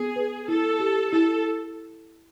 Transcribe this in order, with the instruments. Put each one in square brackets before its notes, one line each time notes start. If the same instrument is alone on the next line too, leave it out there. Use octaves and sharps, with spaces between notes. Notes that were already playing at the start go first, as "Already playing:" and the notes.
Already playing: [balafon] B3 [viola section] G#4
[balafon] B4
[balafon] E4 [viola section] A4
[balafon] G4
[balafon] E4 [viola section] A4